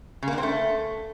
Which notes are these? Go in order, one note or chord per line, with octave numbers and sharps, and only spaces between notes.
C#3
A#3
D4
C4
A3